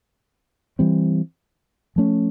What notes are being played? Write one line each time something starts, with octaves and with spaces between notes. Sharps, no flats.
E3 G3 C4
F3 A3 C#4